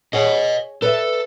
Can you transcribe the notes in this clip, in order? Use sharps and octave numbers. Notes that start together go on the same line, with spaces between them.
G#4 C#5 D#5 F#5
A4 B4 D5 E5